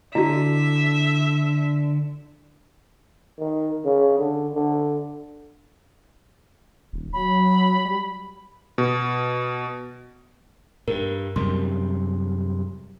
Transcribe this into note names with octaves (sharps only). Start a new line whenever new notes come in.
D3 E4 F#4 E5
D#3
C#3
D3
D3
D#1
F#3 B5
G3
B2
G2 A#4
F#2 C3 G3 C6